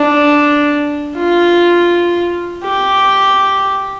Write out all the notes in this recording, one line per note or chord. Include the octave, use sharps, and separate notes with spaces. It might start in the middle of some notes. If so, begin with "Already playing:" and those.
Already playing: D4
F4
G4